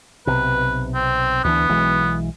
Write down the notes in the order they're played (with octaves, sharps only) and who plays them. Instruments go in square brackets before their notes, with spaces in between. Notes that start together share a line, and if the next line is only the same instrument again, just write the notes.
[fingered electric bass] B1 C3 [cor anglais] B4
[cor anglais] C4
[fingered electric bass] D2 E3 D4 [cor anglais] B3
[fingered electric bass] B1 E3 G#3